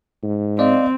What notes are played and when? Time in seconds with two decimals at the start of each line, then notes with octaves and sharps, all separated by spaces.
0.23 G#2
0.59 C4 D5 D#5 F5